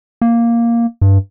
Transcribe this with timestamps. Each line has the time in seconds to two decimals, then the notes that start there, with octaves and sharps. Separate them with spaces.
0.21 A#3
1.01 G2